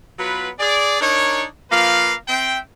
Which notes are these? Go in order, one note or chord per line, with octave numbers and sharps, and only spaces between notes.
F#3 B3 F4 B4
G#4 D5
D4 D#4 A#4 C#5
F3 A#3 B4 F5
C4 E5 G5